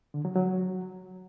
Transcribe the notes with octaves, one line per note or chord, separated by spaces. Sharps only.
D3
F#3
F#3